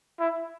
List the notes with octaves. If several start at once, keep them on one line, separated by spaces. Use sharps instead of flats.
E4